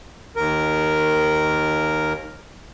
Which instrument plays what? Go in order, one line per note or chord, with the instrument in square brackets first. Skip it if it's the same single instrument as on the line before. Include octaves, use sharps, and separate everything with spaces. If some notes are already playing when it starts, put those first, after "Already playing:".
[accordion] D#2 A#4